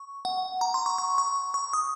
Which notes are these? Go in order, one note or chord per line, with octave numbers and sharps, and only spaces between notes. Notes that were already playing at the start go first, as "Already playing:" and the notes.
Already playing: C#6
F#5
A#5
C6
C#6
C#6
C#6
C#6
D#6